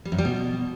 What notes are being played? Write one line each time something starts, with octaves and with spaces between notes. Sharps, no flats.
G3
F#2
G3
B2